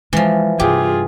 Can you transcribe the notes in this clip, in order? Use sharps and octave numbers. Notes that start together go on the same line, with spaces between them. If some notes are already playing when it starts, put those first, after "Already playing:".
E3 F3 G#3
G2 C3 F4 G4 G#4